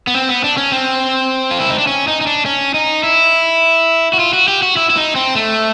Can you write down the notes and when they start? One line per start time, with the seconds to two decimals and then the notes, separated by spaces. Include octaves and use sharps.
0.07 B3
0.15 C4
0.29 B3
0.44 D4
0.57 C#4
0.72 C4
1.51 F4
1.60 E4
1.70 D#4
1.78 D4
1.87 C#4
2.08 D#4
2.21 D#4
2.27 D4
2.46 C#4
2.74 D#4
3.03 E4
4.13 F#4
4.19 F4
4.33 F#4
4.48 G4
4.62 F#4
4.77 E4
4.90 E4
4.97 D#4
5.15 C4
5.35 A3